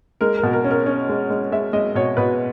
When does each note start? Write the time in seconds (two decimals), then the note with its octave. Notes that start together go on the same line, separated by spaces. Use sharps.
0.21 G#3 A#4
0.37 A#4
0.43 B2
0.53 A#4
0.64 C#4
0.71 A#4
0.86 C#4
1.09 G#3
1.30 G#3
1.52 G#3 E5
1.73 G#3 D#5
1.95 B2 C#5
2.17 B2 B4